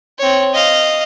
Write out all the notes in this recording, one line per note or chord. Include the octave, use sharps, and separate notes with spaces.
C4 C#5
D#5 F5